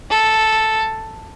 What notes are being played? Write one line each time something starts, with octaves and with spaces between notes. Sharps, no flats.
A4